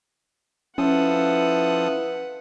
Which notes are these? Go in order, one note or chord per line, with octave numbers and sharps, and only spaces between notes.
F3 C#4 E4 A4 B4 F#5 D#6